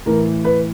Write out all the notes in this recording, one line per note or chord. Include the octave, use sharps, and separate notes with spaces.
A2 E3 A#4
B4